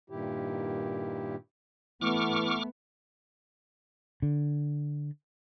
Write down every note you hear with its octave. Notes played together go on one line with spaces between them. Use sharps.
G2 A#2 D#3 E4 G4
E3 A3 B3 C#6 D6 F6
D3